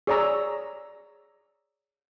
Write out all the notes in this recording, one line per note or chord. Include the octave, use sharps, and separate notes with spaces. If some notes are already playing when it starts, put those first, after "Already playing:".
G#4 C#5 D5 A#5 E6